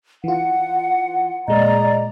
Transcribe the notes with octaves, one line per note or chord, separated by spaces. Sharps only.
E3 F4 F#5
A#2 G#3 D5 D#5 A#5